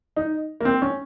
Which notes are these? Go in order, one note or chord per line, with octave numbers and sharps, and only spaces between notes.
D#4
A#3
C4
C#4